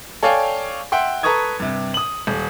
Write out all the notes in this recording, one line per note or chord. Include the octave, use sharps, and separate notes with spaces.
A4 C#5 D5 F5 G5 G#5
E5 F#5 G5 C6
A4 B4 A#5 C#6 D#6 G#6
G2 C3
D#6 F#7
D#1